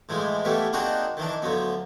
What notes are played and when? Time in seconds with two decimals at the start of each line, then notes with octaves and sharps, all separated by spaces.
0.09 A2 E3 F3 G#3
0.45 E3 G3 A3 B3 F5
0.73 A#3 C4 D4 D#4 F#4 G#4
1.17 D#3 E3 D4
1.42 D2 F3 F#3 B3